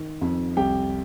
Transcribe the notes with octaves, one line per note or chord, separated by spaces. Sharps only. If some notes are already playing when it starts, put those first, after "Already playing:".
Already playing: D#3
F2
C2 G4 G5